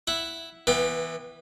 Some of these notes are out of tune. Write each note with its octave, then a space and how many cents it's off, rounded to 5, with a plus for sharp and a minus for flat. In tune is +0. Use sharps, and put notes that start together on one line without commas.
E4 +0 F#5 +0
E3 +0 B3 -20 G5 +25